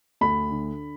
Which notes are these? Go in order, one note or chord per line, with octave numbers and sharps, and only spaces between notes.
D2 B5
D3